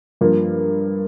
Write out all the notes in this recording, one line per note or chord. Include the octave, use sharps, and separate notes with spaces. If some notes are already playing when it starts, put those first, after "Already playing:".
G2 F3 A#3